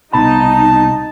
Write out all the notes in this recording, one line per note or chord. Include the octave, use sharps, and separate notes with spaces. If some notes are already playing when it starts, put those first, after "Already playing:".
C2 B2 D#4 A5 B5